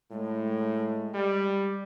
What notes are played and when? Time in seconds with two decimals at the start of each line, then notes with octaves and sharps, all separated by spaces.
0.11 A2 G#3
1.14 G3